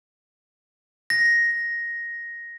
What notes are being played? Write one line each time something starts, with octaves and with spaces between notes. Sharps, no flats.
A#6